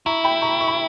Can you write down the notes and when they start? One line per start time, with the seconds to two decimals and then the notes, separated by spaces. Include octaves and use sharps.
0.06 E4 A#5 C#6
0.24 G5 B5
0.42 A#5 C#6
0.60 C#6
0.68 B5